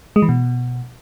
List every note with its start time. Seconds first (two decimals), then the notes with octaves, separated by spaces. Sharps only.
0.16 G#3
0.22 E3
0.29 B2